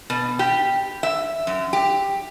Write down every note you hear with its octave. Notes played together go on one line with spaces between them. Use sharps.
B2
G4
E5
F#2
G4